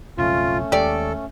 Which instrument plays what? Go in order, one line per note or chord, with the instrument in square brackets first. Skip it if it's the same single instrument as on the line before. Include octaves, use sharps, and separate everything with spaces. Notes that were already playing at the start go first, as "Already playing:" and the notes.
[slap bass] B1 F2 C#3 [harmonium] A3 C#4 [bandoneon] F4
[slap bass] D#2 G#3 [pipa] G4 D5 [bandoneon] A4